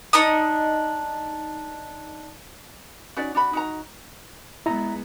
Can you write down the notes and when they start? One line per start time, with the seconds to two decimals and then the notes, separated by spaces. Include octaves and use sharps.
0.13 D4 D#4 D#6
3.17 C#4 D#4 F#4 D5
3.35 D4 F#4 B5
3.53 D#4 F#4 A#5
4.66 G#3 B3 E4 A#5